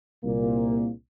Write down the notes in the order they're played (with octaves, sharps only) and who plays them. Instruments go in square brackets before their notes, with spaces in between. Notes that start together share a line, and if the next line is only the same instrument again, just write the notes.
[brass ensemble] C2 A#2 A#3